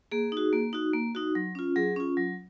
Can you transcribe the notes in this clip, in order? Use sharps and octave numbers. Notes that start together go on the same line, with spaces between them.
A#3 G#4
D#4 F#4
A#3
D#4 F#4
A#3
D#4 F#4
F#3
C#4 F4
F#3 G#4
C#4 F4
F#3